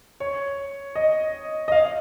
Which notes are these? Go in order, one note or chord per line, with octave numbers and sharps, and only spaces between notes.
C#5
D#5
D#5
F5